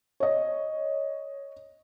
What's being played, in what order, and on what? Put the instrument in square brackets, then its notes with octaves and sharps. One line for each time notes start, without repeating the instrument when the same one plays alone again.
[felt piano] C#5 D#5